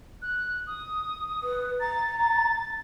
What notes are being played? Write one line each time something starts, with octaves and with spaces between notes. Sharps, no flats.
F#6
D#6
B4
A#5 A6
A6